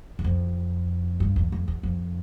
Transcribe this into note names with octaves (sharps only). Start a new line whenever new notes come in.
E2
F2
G2
E2
F2
E2
F2